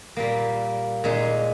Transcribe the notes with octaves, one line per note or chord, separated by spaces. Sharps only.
A#2 G3 A#3
A#2 G#3 D#4